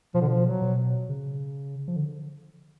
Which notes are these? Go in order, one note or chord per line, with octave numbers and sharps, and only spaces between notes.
B2 F3
D3
F3
F#3
B2
C#3
F3
D3